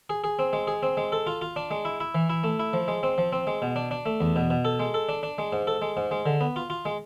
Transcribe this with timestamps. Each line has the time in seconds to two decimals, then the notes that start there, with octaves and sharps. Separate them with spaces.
0.10 G#4
0.24 G#4
0.39 C4
0.53 G#3
0.67 G#4
0.83 C4
0.97 G#3
1.12 A4
1.27 F4
1.41 F4
1.56 D4
1.71 G#3
1.85 E4
2.00 E4
2.15 E3
2.30 E4
2.44 A3
2.59 E4
2.73 F3
2.88 G#3
3.03 C4
3.18 F3
3.32 C4
3.47 G#3
3.62 B2
3.76 D4
3.91 D4
4.06 A3
4.21 E2
4.36 B2
4.50 B2
4.65 A4
4.79 G#3
4.94 A4
5.09 D4
5.23 D4
5.38 G#3
5.53 G#2
5.67 A4
5.82 G#3
5.97 G#2
6.11 G#3
6.26 D3
6.41 B3
6.56 F4
6.70 F4
6.85 G#3